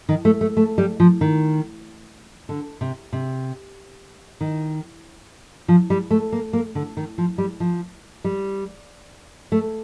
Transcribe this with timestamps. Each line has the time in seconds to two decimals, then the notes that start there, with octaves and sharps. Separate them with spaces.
0.09 D#3
0.25 A3
0.41 A3
0.57 A3
0.78 G3
1.00 F3
1.21 D#3
2.49 D3
2.81 C3
3.13 C3
4.41 D#3
5.68 F3
5.90 G3
6.11 A3
6.32 A#3
6.53 A#3
6.75 D3
6.97 D#3
7.18 F3
7.38 G3
7.60 F3
8.24 G3
9.52 A3